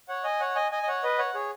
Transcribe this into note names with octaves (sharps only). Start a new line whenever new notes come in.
C#5 F#5
D#5 G#5
C#5 F#5
D#5 G#5
D#5 G#5
D#5
C#5 F#5
B4 D#5
C#5 F#5
G#4 C#5